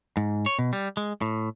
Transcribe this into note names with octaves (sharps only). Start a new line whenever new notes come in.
G#2
C#5
B2
G3
G#3
A2